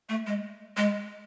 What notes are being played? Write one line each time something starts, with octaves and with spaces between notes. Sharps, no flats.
A3
G#3
G#3